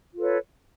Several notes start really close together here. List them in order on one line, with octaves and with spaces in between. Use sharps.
F4 A4 B4 C#5